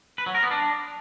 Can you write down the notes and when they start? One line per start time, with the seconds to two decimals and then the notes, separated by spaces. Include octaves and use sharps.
0.18 B4
0.26 F#3
0.35 A#4
0.43 B3
0.51 D4